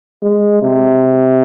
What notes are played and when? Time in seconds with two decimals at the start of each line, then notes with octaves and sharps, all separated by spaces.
0.23 G#3
0.62 C3